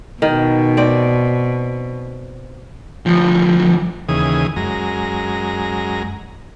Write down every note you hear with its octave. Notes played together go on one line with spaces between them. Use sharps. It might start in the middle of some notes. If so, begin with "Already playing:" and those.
B2 D#3
C4 D5
D2 F3
D#2 C#3 E3 G#4 D#6
F#2 G#3 A#5